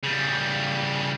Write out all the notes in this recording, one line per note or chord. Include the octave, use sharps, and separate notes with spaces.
C#3 G3